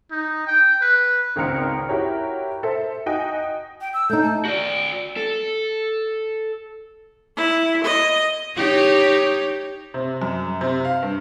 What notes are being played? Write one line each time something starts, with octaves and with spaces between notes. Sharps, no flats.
D#4
G5
B4
G#1 C#2 C4 A#4 F6 C#7
E4 F#4 G4 A#4 C#5
A4 C5 E5
D#4 F#4 D#5 G5 G#5
G5
E6
A3 D#4 G6
A5
F#4 D5
A4
E4
D#5
D#4 G4 C#5
C3
F#2
C3
F5
G2